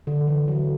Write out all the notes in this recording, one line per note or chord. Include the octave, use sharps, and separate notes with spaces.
D3
E3
F#3